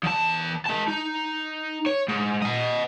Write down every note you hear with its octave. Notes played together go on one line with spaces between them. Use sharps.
E2 A5
G#3 A5
D#4
C#5
G#2
D#5 F#5